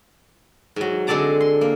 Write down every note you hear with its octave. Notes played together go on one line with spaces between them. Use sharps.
G#2 F#3
D3 G#3 C4 D5 A5 A#5
C6
A#3